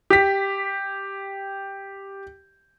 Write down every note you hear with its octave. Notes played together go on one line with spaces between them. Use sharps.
G4 B6